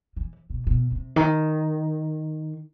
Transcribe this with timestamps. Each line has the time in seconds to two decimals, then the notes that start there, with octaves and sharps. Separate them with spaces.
0.16 E3
0.50 B2
0.67 B2
0.92 C3
1.16 D#3